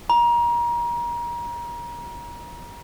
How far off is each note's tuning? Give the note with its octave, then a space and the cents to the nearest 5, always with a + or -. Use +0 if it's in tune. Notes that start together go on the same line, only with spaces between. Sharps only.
A#5 +30